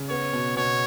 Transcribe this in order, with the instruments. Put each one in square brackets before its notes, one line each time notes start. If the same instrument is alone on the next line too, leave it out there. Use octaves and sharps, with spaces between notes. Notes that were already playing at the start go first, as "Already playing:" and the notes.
Already playing: [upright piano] C#3
[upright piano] B3 [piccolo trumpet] C#5
[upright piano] B2
[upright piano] B2 [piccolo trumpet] C#5